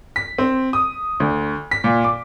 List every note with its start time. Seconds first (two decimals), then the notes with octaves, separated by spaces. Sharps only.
0.16 B6
0.38 C4
0.73 D#6
1.20 D2
1.71 B6
1.84 A#2
2.04 D6